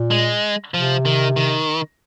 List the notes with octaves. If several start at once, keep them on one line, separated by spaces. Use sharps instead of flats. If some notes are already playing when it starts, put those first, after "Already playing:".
Already playing: A#2
G#3
C3 F3
D#3
D#3